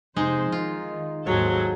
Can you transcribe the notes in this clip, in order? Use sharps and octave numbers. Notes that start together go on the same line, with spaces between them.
F2 C3 G#3 D#4 C5
D#3 F4
G#1 D#2 G#2 F#3 G#4 A4 C5 C#5